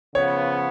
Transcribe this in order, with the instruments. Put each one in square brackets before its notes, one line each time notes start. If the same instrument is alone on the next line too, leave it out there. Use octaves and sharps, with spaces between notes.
[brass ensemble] C#3 F3 B3 [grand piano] C#5